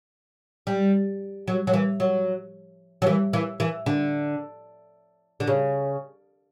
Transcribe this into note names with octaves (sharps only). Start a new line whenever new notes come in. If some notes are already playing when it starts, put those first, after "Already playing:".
G3
F#3
F#3
E3
F#3
F#3
E3
E3
E3
D3
D3
C#3